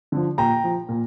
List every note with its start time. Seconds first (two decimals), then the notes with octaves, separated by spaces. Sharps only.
0.12 D3 F3
0.38 A#2 G5 A#5
0.64 F3
0.89 A#2